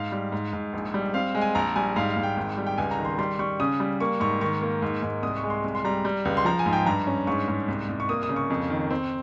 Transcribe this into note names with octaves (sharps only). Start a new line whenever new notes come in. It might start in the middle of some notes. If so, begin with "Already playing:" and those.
Already playing: G#2 F5
G3
G#2
G#2
A#1
G3
C4 F5
G#3
G#5
A#1 A#5
G3 G#5
G#2 F5
F5
G#2
G5
G#1
G3
G5
C#2 G#5
A#5
D#3
C6
G3 C6
G3 C#6
C#3 D#6
G3
A#3 C#6
G#2 C#6
D#3 C#6
A#3
G#2
G#2
C2 D#6
C#6
G#3
C6
C2
C6
G3 A#5
G3
C#2
C6
F3 A#5
G#5
G#2
G5
G2 A#5
C#4
G#2 C#6
G#2
C2
C2
C#6
A#3 D#6
D#6
C#3
C#6
F2
D#3
C4